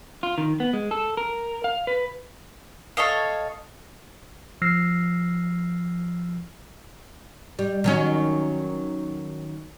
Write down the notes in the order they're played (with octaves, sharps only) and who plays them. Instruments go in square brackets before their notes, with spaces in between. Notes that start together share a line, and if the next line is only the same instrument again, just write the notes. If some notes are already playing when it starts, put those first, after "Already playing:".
[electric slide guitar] F4
D#3
B3
G#3
A4
A#4
F5
B4
[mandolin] A4 C#5 D#5 F5
[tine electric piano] F3 E6 F6 A#6 C7
[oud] G3
D#3 F#3 C#4